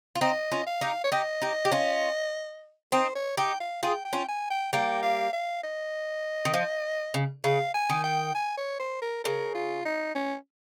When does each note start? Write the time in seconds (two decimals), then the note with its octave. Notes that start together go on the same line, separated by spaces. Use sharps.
0.15 F4
0.21 C4 D#4 D#5
0.51 C#4 F4
0.67 F5
0.81 D#4 G4
1.04 C#5
1.12 D#4 G4 D#5
1.42 D#4 G4
1.65 G4
1.72 C#4 F4
2.92 C4 D#4 C5
3.15 C#5
3.37 D#4 G4 G5
3.60 F5
3.83 F4 G#4 G5
4.05 G5
4.13 C#4 F4
4.28 G#5
4.50 G5
4.73 G3 A#3 G5
5.03 F5
5.33 F5
5.63 D#5
6.45 D#3
6.54 F3
7.14 C#3
7.44 C#3 F5
7.74 G#5
7.90 D#3
8.04 G5
8.35 G#5
8.57 C#5
8.79 C5
9.02 A#4
9.24 C#3 A#4
9.55 F4
9.85 D#4
10.15 C#4